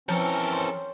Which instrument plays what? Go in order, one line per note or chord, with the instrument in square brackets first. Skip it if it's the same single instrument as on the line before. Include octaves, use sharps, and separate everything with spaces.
[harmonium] E3 C4 C#4 [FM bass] F3 [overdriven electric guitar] A4 A#4 [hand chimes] C5 C#5
[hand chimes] C#5 C6